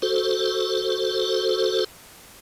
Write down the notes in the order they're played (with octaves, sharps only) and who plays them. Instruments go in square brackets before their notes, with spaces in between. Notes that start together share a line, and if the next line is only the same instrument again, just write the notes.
[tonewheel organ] F#4 A4 C5